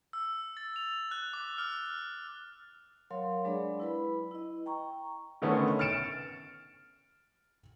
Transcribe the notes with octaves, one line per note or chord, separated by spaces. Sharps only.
E6
A6
F7
F#6
D6
F6
F#3 A#4 C#5 F5 C6
F#3 G#3 D4 G#4 D5 B5
E4 B4 B5
E4 D#5
G5 A#5 C#6
D3 D#3 A3 B3 C#4
F6 A6 C#7 D7 E7